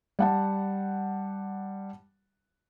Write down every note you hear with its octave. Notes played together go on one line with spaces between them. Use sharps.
G3 F#5 A5